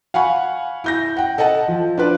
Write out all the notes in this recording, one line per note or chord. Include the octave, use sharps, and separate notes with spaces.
F5 F#5 G#5 B5 C#6
E4 G6 A#6
F#5 G5
A4 D#5 F#5 A5
F3
D4 F4 B4 D5